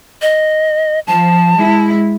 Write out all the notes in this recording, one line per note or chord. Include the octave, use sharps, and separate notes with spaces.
D#5
F3 A5
G#3 E4